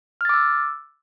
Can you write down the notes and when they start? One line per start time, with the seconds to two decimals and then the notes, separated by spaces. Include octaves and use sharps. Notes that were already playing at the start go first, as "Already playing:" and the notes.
0.21 F6
0.25 A6
0.29 D6
0.34 E6